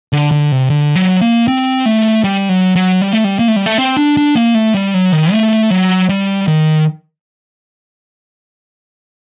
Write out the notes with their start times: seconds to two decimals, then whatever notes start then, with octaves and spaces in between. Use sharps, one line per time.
0.13 D3
0.31 D3
0.52 C3
0.70 D3
0.96 F#3
1.21 A#3
1.48 C4
1.86 A3
2.24 G3
2.49 F#3
2.76 F#3
3.01 G3
3.13 A3
3.24 G3
3.39 A#3
3.48 A3
3.56 G3
3.66 A3
3.78 C4
3.97 D4
4.17 D4
4.35 A#3
4.54 A3
4.74 G3
4.94 F#3
5.12 D#3
5.32 A3
5.70 F#3
6.09 G3
6.48 D#3